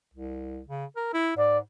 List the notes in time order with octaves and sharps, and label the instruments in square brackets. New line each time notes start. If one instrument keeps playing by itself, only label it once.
[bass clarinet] C2
C#3
A#4
E4
[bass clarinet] G#2 [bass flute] D5